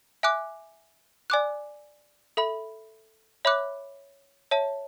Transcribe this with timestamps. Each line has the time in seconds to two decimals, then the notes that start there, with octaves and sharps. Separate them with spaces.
0.23 E5 G#5 D6 F#6
1.30 D5 G#5 D6 F#6
2.37 A4 E5 B5
3.45 C#5 E5 B5 D6 F#6
4.51 C#5 E5 A5